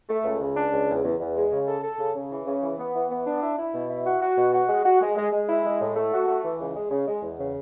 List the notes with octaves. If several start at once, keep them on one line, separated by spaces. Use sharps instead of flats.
A3
C#2
C#2
D4
C#2
E2
E2
E2
G#3
C#3
A4
A4
C#3
C#3
E3
C#3
E3
B3
E3
B3
D4
E4
E4
B2
E4
F#4
F#4
B2
F#4
G#3
F#4
G#3
G#3
G#3
E4
G#3
A2
A3
F#4
A3
E3
C#2
G#3
C#3
G#3
E2
C#3